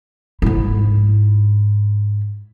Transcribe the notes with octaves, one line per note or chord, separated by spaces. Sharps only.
G#2 E4